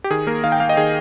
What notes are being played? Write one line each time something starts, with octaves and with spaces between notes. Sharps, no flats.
G4
D#3 G#4
A#3 A#4
D#3 F5
G5
A#3 F5
D#5
D#3 G#4